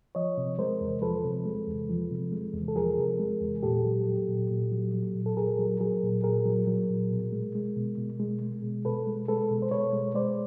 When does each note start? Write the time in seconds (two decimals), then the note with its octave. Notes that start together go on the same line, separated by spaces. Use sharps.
0.15 F3 C#5 D#5
0.38 C3
0.58 G#3 A#4 C5
0.81 E2
1.02 F3 A4 B4
1.24 C3
1.45 G#3
1.68 E2
1.90 F3
2.11 C3
2.32 G#3
2.54 E2
2.68 A4
2.76 F3 G#4 A#4
2.98 C3
3.19 G#3
3.42 E2
3.63 A#2 G4 A4
3.85 F#3
4.07 F#3
4.28 A#2
4.50 A#2
4.72 F#3
4.94 F#3
5.15 A#2
5.26 A4
5.37 A#2 G#4 A#4
5.59 F#3
5.80 F#3 G#4 A#4
6.03 A#2
6.24 A#2 G#4 A#4
6.46 F#3
6.67 F#3
6.90 A#2
7.11 B2
7.32 G#3
7.55 G#3
7.77 B2
7.98 B2
8.19 G#3
8.41 G#3
8.63 B2
8.85 B2 A4 B4
9.07 G#3
9.28 G#3 A4 B4
9.51 B2
9.62 C5
9.71 B2 B4 C#5
9.93 G#3
10.15 G#3 C5 D5